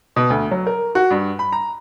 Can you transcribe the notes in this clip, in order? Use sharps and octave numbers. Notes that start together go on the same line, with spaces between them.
B2
D2
F#3
A#4
F#4
G2
B5
A#5